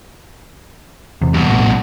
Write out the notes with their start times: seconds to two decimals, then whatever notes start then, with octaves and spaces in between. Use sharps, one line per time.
1.21 E2 C3
1.34 G2 B2
1.48 A#1 A2